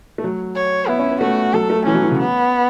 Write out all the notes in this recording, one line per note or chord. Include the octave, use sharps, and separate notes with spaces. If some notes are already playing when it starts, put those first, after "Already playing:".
A3
F#3
C#5
B3 E4
C#4
B3
A3 F#4
F#3 A4
A3
E3 C#4
F#3
E3
C#3
B3